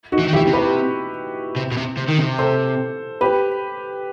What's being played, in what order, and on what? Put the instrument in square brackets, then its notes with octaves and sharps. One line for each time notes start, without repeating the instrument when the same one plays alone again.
[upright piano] D#4 F#4
[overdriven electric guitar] E3
D#3
[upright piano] E4 G4
[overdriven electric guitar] E3
C3
[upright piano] G4 B4
[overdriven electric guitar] C3
B2
C3
C3
D#3
C3
[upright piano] A4 C5
G4 B4